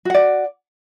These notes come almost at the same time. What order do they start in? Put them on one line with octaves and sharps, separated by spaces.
F#4 F#5 D5